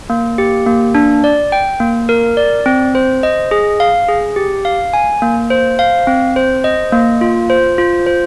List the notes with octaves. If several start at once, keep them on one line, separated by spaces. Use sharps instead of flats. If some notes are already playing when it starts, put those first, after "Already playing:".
A#3
G4
A#3
D4
D5
G5
A#3
A#4
D5
C4
C5
D#5
G#4
F5
G#4
G4
F5
G#5
A#3
C5
F5
C4
C5
D#5
A#3
F4
C5
F4
C5